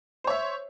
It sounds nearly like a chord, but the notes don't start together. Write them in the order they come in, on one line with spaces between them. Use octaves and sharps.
C5 C#5 E5